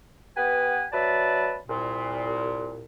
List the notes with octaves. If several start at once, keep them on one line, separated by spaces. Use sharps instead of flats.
B3 G4 B4 F#5 G#5
F#3 B4 D5 E5 A5
C2 A#2